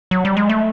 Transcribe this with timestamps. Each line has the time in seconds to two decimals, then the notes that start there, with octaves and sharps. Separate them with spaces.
0.11 F#3
0.25 G3
0.37 G#3
0.49 A3